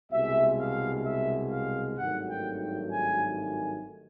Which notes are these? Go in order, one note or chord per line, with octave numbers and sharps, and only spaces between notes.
C2 B2 G#3 E5
F5
E5
F5
G#1 G2 D#3 F#3 A3 F#5
G5
G5
G#5
G#5